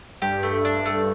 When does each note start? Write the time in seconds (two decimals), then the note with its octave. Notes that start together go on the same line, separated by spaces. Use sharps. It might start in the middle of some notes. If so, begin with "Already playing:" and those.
0.22 G2 G4
0.43 A3
0.65 D4
0.86 A3